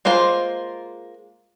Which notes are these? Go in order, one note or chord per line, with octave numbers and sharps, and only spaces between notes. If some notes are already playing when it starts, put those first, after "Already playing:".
G#3 A#3 F4 C5